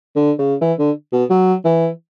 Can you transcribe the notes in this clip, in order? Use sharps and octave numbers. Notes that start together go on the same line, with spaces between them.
D3
C#3
E3
D3
B2
F#3
E3